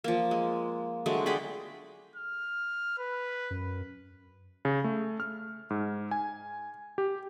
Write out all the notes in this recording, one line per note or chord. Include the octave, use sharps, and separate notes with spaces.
F3 A#3
G#3
D3 F#3 G#3 A3
G#4 D5 G5 B5
F6
B4
F#2
C#3
A3
F6
G#2
G#5
G4